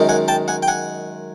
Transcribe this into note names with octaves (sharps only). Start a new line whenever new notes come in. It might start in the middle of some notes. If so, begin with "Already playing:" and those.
Already playing: F#2 D#3 G#3
F#5 G#5
G5 A5
F#5 G#5
G5
F#5 G#5